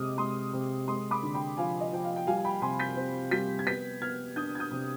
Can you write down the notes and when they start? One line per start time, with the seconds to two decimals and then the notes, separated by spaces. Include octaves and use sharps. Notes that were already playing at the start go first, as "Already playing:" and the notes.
Already playing: C3 G#3 D#5 G5 D6 D#6 F6
0.18 G#3 C6 D#6
0.53 C3
0.88 G#3 C6 D#6
1.11 B5 D6
1.23 D3
1.34 G5 B5
1.57 F3 F5 G#5
1.81 D#5
1.92 F3 G5
2.04 F5
2.16 G5
2.27 G3 F5 G#5
2.37 G#5
2.45 G5 B5
2.62 C3 G#5 C6
2.80 G6 B6
2.97 C4
3.31 G3 G6 B6
3.59 G#6
3.67 B3 G6 B6
4.01 B3 F6 G#6
4.36 D4 D#6 G6
4.55 G#6
4.59 D#6 G6
4.71 C3